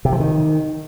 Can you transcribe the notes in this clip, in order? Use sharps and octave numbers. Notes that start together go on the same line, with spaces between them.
C3
F3
D#3